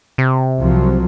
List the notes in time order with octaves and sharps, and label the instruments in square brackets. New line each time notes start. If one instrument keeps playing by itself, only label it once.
[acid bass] C3
[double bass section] C2 F3 F#3